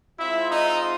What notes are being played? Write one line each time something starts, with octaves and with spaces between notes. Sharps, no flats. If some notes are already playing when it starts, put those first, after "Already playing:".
G#3 C4 E4 F4 E5
D#4 D#5